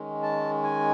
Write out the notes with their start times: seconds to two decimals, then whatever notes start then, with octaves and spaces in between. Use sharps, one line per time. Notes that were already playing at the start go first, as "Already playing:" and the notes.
Already playing: D#3 G#3 C#4
0.22 A5
0.63 G#5